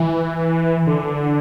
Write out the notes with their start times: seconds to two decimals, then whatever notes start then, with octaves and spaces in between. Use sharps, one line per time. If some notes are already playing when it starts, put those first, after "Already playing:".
Already playing: E3
0.87 D3